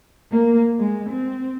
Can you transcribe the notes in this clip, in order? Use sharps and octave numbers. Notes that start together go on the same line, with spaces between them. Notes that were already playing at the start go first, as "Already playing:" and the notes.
A#3
G#3
C4